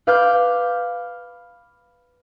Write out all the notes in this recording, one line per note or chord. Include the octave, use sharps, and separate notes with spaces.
B4 F5 D6 F6 G6